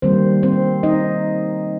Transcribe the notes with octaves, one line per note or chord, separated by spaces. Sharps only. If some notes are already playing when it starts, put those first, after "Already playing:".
D#3 G3 A#3 C4 C5
C4 C5
D#4 D#5